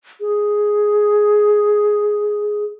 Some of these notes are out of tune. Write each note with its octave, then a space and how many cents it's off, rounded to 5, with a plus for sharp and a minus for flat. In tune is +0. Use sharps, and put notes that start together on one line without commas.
G#4 +5